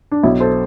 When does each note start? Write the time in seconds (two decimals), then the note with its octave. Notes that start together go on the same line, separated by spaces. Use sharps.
0.11 D4
0.23 B1 E4
0.40 A4 C5